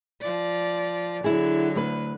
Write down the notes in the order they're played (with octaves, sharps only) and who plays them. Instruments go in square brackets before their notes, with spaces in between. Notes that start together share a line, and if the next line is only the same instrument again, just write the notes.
[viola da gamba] F3 D5
[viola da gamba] D3 F#3 [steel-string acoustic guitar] E4 G#4
[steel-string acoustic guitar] D2 B4